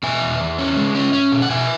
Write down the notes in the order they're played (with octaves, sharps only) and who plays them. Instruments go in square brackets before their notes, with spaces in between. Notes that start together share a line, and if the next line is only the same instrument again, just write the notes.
[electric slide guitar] B2 E5 G#5
E2
E2
C#4
G#3
C#4
C#4
B2
F#5
B2 E5 G#5